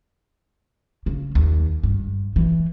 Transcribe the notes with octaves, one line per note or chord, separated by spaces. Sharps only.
C#3
D#2
G2
E3